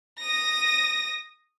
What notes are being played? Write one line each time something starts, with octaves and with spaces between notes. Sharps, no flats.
D#6 A#6